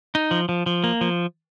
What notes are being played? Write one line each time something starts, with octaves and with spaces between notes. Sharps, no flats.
D#4
F3
F3
F3
A#3
F3